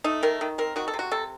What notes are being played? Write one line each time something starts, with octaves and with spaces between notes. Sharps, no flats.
A3 D#4
D#3 A#4
D#3
C4 A#4
D#3 F#4
A4
C3
F#4
C3 A4